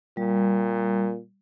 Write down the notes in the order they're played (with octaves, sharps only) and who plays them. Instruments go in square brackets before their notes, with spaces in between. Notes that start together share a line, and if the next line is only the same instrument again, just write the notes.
[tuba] A#2 [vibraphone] G3